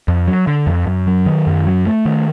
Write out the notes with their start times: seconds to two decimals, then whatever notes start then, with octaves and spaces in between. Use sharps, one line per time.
0.08 F2
0.28 F#3
0.47 D3
0.67 F2
0.87 F#2
1.07 F#3
1.26 D#3
1.47 F#2
1.67 F#3
1.87 A3
2.05 D#3